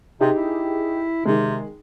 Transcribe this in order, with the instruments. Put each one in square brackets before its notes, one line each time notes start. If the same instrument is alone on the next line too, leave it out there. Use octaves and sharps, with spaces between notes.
[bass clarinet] C3 [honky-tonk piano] D#4 G4 G#4
[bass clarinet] E4
[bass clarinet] C3 [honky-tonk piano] D#3 G#3